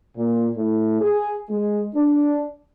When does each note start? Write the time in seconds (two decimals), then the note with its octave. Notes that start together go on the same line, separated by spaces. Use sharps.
0.17 A#2
0.56 A2
1.01 G#4
1.50 G#3
1.95 D4